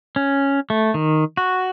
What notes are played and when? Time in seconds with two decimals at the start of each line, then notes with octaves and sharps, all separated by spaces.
0.16 C#4
0.70 A3
0.94 D#3
1.37 F#4